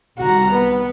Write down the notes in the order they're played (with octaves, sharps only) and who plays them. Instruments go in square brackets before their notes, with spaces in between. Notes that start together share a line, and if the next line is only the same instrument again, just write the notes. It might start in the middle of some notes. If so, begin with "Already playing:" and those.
[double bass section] C2 D#3 G3 [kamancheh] F#4 A#5
[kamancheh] B3